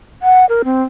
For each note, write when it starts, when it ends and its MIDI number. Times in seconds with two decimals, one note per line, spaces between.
0.22 0.45 78
0.49 0.62 70
0.65 0.82 60